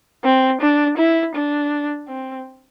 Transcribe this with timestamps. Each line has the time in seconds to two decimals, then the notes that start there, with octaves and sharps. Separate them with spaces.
0.24 C4
0.61 D4
0.98 E4
1.35 D4
2.08 C4